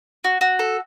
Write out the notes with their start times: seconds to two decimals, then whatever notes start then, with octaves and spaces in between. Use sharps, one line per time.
0.24 F#4
0.41 F#4
0.59 A4